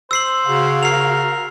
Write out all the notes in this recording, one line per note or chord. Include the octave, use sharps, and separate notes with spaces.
C5 E6 C7 F#7
C#3 F#4 F5
A#4 C7 F7